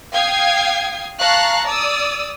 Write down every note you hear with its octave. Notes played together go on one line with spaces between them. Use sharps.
F5 G5 D#6 G#6 C7
F5 A5 A#5 C#6 F#6
D5 D#6 E6